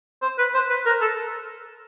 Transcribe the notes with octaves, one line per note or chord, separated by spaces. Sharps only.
C5
B4
C5
B4
A#4
A4